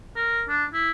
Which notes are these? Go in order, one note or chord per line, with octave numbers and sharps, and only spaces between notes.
A#4
D4
E4